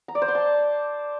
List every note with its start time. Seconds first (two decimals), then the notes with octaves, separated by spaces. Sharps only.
0.08 A#5
0.15 D5
0.22 C5
0.28 C6
0.35 A5